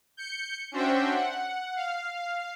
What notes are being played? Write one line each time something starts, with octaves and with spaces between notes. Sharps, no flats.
G6 C#7
C#4 D4 F#4 C5 E5 G5
F#5
F5